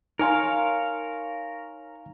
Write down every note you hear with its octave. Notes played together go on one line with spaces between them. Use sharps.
D#4 A#4 C#5 F5 G#5 C6